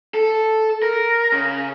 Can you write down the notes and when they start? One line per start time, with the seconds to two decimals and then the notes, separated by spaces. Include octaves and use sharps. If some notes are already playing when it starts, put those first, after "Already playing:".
0.14 A4
0.83 A#4
1.32 C#3